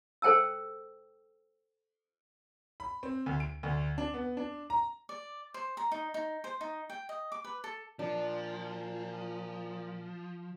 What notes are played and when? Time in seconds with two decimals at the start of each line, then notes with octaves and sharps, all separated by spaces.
0.22 A4 C5 G5 A5 E6
2.80 B5
3.03 C4
3.26 D2
3.40 D7
3.63 D2
3.98 D4
4.14 B3
4.37 D4
4.70 A#5
5.09 D5
5.54 C5
5.77 A#5
5.92 D#4
6.14 D#4
6.44 C5
6.61 D#4
6.90 G5
7.09 D#5
7.32 D6
7.44 B4
7.64 A4
7.99 A#2 F3 D4